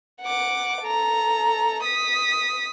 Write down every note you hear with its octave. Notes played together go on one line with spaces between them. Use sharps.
F#5 D6
A4 A#5
D#6 B6